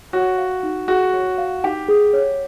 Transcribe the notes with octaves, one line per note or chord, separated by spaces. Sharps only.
F#4 C#5
F5
D#4
F#4 G#4
C#5
F5
D#4 G4
G#4
C#5